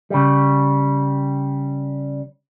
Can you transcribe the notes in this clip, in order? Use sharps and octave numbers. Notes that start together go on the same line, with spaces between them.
C#3 G3